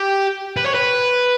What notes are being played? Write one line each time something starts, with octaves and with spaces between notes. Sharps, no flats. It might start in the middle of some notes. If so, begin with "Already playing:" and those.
Already playing: G4
B4
C#5
B4